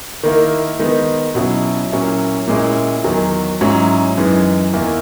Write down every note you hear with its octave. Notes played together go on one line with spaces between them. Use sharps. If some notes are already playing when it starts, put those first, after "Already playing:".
D#3 A#3 E4
D#3 G#3 B3 D#4
B2 F#3 C#4 E4
A#2 F#3 C#4 E4
A#2 G#3 C#4 E4
E2 D#3 F#3
G#2 F#3 C#4 E4
F#2 E3 G#3 D#4
E2 D#3 A#3 E4